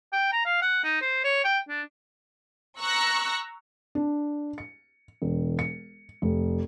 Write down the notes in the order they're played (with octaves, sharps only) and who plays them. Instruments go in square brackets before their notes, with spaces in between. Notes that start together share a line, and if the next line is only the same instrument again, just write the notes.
[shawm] G5
A#5
F5
F#5
D#4
C5
C#5
G5
D4
[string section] A#5 C#6 E6 F#6 A#6
[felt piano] D4
C#7
E1
C#7
F1